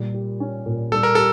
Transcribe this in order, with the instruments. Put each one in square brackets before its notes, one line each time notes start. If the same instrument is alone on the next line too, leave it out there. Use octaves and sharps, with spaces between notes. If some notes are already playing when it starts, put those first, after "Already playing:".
Already playing: [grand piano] A#2 G3
G4
C#4
A#2
[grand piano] G3 [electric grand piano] A4
[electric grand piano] A#4
[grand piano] G4 [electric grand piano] A4